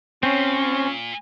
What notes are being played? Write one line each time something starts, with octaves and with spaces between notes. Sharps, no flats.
A#2 C4 C#4